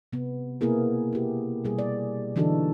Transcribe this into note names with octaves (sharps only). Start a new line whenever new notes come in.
C3 B3
B2 A#3 B3 E4 G#4 A#4
E4 G4
B2 G3 G#4
D5
D3 E3 D4 D#4 F#4 A4